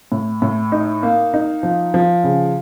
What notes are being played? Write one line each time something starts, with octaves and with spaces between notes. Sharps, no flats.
A2
A2
D#4
A#3
D#4
F3
F3
C#3